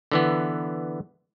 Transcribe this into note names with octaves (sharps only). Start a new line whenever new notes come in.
D3 E3 B3